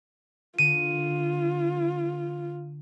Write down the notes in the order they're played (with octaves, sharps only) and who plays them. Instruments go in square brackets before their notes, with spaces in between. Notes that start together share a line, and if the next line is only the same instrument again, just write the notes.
[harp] D3 [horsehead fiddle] F4 [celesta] D#7